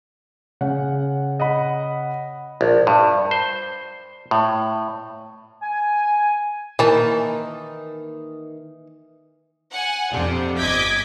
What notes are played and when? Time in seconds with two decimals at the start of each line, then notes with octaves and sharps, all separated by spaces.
0.61 C#3 F#5
1.40 D#5 F#5 B5
2.61 A#1
2.87 G2
3.31 C5
4.31 A2
5.61 G#5
6.79 D#3 E3 A#3 A5
9.73 F#5 G#5
10.11 F2 C3 D4 F4
10.58 G1 D#5 D6 G#6 B6